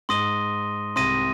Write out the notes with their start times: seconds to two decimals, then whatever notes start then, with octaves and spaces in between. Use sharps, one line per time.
0.09 G#2 C6 D#6 A#6 D#7 G7
0.96 C2 C3 C6 D#6 A#6 D#7